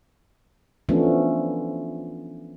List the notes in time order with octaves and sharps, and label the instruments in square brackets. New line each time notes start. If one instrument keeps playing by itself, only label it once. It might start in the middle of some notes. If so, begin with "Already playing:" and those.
[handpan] E3 F3 A3 B3 C#4 D4